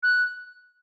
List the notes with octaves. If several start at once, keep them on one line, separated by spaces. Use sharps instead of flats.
F#6